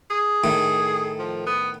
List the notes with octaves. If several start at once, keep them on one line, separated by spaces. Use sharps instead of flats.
G#4
A2 D#3
A4
F3
B3